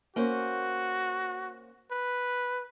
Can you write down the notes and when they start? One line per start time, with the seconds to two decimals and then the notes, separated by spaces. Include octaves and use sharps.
0.16 A#3 C#4 F#4 C5
1.91 B4